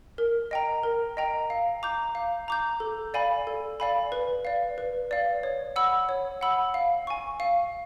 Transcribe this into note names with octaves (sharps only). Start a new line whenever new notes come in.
A#4
D#5 G5 A#5
A#4
D#5 G5 A#5
F5
A#5 D6 G6
F5
A#5 D6 G6
A4
D5 F5 G#5 B5
A4
D5 F5 G#5 B5
B4
D5 F5
B4
D5 F5
C#5
F#5 B5 E6
C#5
F#5 B5 E6
F5
G#5 C#6
F5